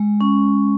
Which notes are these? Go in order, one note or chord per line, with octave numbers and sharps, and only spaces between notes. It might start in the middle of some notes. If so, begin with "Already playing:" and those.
Already playing: G#3
C#4